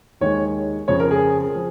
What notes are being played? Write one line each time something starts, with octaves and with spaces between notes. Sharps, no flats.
D#2 D#3 G#3 C#5
F2 C#3 F3 C#5
A#4
G#4
F3